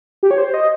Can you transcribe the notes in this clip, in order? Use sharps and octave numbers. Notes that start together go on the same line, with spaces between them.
G4
C#5
C5
D#5